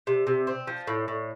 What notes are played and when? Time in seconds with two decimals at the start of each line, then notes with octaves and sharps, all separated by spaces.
0.07 C3
0.27 C3
0.47 C4
0.67 F3
0.87 A2
1.08 A2